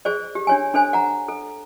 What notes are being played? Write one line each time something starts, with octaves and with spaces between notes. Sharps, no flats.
G#4 C5 D5
G4
D4 C#5 G#5
D4 A4 C5 G#5
F#5 A#5
A4